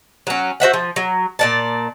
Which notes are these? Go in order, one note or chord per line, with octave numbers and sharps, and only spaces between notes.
F#3 C#4
F#4 C5 E5 F#5
F3
F#3
A#2 D5 A5